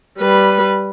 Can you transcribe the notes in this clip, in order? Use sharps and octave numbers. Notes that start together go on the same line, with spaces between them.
G3 B4